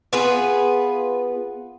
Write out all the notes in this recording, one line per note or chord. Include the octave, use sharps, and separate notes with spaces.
B3 F4 G#4 B4